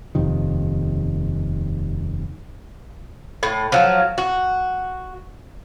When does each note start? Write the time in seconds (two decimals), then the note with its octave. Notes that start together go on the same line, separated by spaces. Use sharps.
0.15 D#1 F2 C3 D#3
3.43 A2
3.72 F3 F#3
4.18 F#4